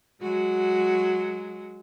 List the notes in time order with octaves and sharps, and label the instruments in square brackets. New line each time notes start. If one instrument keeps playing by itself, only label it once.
[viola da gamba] F#3 G#3 F#4